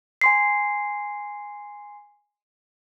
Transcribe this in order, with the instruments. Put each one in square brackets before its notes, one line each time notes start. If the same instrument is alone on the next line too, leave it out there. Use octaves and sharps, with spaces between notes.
[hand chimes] G#5 C6 C7